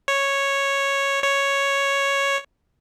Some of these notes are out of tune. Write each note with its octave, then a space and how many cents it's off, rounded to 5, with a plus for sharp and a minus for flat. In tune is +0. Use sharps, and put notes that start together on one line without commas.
C#5 -5
C#5 +0